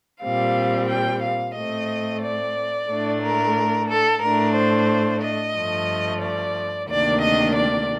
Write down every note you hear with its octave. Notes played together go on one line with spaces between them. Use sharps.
A#2 G3 C4 F5
G5
F5
A2 A3 C4 D#5
D5
A2 A3 D4
A#4
A4
A2 A3 D4 A#4
C5
D#5
G2 F3 A3
D5
D2 C3 D#3 A#3 D4 D5
D#5
D5